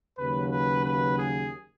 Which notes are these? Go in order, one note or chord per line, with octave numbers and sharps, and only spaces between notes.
D#2 C#3 F#3 B4
B4
B4
G#4